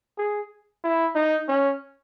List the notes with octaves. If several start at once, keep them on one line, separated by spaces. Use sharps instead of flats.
G#4
E4
D#4
C#4